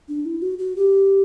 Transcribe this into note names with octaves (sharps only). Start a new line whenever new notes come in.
D4
E4
F#4
F#4
G4